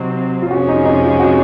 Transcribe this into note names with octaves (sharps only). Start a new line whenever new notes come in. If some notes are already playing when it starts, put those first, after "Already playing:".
Already playing: C3 F#3 C4 D#4
F4
F2 C3 F3 G#3 C#4 F#4
D#4
D#4
F4
F#4